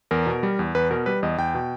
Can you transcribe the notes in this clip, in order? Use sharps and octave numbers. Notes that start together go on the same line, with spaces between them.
E2 A#4
B2
G3
E2
E2 B4
B2 A#4
G3 B4
E2 D#5
E2 G5
B2